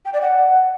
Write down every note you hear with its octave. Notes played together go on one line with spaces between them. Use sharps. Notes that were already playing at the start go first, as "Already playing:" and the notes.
G5
D5
F#5